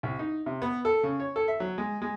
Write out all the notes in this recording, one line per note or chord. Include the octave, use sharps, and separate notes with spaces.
C2
D#4
C3
B3
A4
C#3
C#5
A4
E5
F#3
G#3
G#3